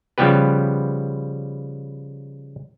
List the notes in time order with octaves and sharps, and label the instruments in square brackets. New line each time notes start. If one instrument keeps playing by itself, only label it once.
[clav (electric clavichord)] C#3 F3 G3 B3 G4 B4